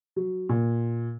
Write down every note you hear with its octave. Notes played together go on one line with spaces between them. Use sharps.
F#3
A#2